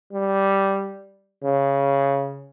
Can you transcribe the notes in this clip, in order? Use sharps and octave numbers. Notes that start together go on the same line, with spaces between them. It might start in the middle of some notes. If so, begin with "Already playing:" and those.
G3
C#3